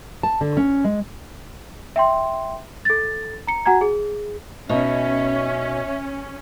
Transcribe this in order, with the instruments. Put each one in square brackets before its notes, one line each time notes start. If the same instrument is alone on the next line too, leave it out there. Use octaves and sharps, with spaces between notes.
[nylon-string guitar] A5
D3
C#4
G#3
[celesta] E5 G5 C6
A4 A6
A#5 C#7
F#4 F#5 G#5 A#5 G#6
G#4
[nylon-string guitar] B2 D#4 [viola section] C#4 [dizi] E5